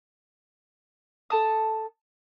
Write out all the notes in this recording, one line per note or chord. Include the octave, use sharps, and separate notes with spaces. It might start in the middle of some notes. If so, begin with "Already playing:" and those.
A4 A5 D#6